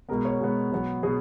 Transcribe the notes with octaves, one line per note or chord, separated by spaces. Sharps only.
B2 G#3 B3 A#4
C#5
B2 G#3 B3
B2 F#3 B3
B2 F#3 B3 G#4